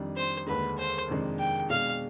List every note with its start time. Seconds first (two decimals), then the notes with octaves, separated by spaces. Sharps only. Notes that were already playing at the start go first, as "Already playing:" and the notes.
Already playing: F2 D#3 G3 D4
0.16 C5
0.47 D#2 D3 G#3 B4
0.78 C5
1.08 F2 C3 D#3 G#3 D4
1.39 G5
1.69 B2 G#3 D4 F5